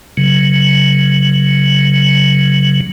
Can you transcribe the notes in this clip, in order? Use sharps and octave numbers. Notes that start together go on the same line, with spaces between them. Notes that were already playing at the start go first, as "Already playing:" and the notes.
C#3 F#3